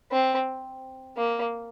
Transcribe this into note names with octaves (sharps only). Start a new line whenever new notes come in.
C4
A#3